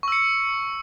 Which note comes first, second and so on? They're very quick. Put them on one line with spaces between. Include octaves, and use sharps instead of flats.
C#6 E6 C#7